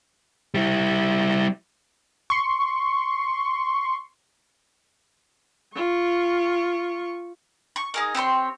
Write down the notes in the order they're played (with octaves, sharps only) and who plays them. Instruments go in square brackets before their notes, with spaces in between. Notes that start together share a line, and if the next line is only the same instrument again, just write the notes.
[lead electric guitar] G3 E4
[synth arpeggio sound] C6 C#6
[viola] F4 C#6
[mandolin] C#6
D#4 G#4 A#4
C4 G4 C#5 C6